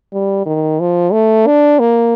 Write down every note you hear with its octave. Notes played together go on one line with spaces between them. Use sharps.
G3
D#3
F3
A3
D4
A#3